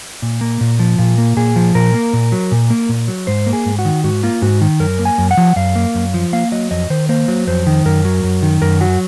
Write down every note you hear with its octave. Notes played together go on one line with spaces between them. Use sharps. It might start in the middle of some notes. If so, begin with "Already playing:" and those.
A#2
A#3
A#2
F3
A#2 F4
A#3
A#2 G#4
F3
A#2 A#4
A#3
A#2
F#3
A#2
A#3
A#2
F#3
G#2 C5
A#3
G#4
G#2
F#4
D#3
G#2 F#4
A#3 F4
G#2 F#4
D#3
F#2 A#4
A#3
G#5
F#2
F#5
F3
F#2 F5
A#3
F#2
F3
A#3 F5
F#3 D#5
F2 D#5
D#3 C5
A#3 C5
F#3
F2 C5
D#3
F#2 A#4
F#3
F#2
D#3
F#2 A#4
F#3 F#4